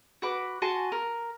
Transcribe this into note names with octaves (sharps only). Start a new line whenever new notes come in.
F#4 B4 D6
F#4 G#5 A5 C6
A#4